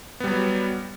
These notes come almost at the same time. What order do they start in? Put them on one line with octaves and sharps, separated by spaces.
B3 G3 F#3